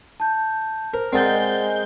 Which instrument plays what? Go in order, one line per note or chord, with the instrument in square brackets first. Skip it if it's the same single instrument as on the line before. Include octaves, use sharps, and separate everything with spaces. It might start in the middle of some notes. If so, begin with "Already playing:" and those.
[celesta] A5 G6
[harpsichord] A#4 [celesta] C5
[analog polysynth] G#3 G6 [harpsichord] C4 A#4 C5 [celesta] D5 F#5 A6